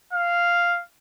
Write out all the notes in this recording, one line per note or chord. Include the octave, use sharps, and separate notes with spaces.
F5